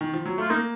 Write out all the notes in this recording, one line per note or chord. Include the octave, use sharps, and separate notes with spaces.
D#3
F3
F#3
A3 F4
A#3 D#4